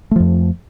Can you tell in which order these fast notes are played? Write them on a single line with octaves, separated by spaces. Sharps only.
A3 F3 F2